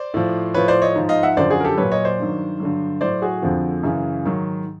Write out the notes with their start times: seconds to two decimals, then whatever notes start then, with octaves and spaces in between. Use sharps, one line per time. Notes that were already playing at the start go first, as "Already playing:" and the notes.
Already playing: C5 D5
0.14 A2 F3
0.54 A2 F3 B4 C#5
0.68 C5 D5
0.82 C#5 D#5
0.95 G#2 F3
1.09 D#5 F5
1.23 E5 F#5
1.37 F#2 D3 F3 C5 D5
1.50 F#4 G#4
1.60 A#4
1.64 G4 A4
1.78 A#2 F#3 B4 C#5
1.92 C#5 D#5
2.05 C5 D5
2.19 G2 D#3 F#3
2.60 G2 D3 F#3
3.01 A2 F#3 C5 D5
3.22 F#4 G#4
3.42 F2 D3 F3
3.83 F#2 C#3 E3
4.25 G#2 D#3 F#3